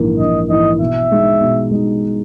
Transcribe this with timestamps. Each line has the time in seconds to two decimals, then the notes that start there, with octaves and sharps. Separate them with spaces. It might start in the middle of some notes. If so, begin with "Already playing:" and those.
Already playing: A#1 G#2 E3 A#3 E4
0.19 A#1 D#5
0.49 G#2 E3 A#3 E4 D#5
0.80 B2 E5
1.11 G#3 D#4
1.41 B2
1.71 G#3 D#4